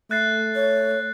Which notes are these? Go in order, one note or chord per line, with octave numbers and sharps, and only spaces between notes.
A3 E5 F#6 A6 C7
C#5